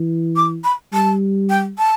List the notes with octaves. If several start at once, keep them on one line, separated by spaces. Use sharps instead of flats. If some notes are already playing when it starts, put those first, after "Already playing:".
Already playing: E3
D6
B5
G3 A5
G5
A5